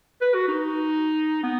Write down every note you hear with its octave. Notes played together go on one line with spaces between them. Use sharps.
B4
F#4
D#4
B3